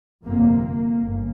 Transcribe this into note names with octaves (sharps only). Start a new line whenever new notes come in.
G1 F2 C3 A#3
A#3
G1